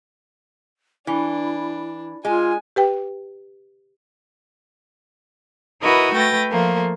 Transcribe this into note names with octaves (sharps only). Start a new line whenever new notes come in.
E3 D4 E4
G#3 F4 G#5
G4 B4 G5
E4 F#4 A#4 B4 D#5 B5
A3 B4 G5 A6 A#6
F3 A3 A#3